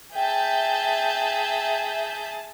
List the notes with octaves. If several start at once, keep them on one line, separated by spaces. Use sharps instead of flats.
G#4 E5 G5 A5 G6